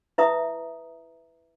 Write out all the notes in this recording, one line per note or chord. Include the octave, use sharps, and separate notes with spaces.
E4 B4 E5 A#5 D#6